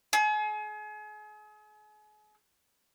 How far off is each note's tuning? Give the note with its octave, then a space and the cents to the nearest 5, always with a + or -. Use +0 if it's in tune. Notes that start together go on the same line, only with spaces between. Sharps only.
G#4 +35